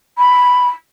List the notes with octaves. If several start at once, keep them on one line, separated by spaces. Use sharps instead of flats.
B5